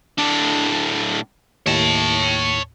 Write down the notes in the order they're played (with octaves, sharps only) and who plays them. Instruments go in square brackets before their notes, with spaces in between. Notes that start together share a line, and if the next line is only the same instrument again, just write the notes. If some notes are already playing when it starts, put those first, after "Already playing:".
[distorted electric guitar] A2 D4
[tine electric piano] D#2 A2 [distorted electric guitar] C#5 A5